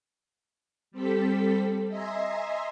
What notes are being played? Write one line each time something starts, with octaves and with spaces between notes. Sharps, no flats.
G3 C4 A4 B6
D#5 E5 G#5 A#5 C6